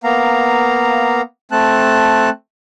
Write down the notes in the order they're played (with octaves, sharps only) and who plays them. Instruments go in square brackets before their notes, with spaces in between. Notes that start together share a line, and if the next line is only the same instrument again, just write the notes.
[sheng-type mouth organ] A#3 B3 F5 A#5
A3 C4 A5 F#6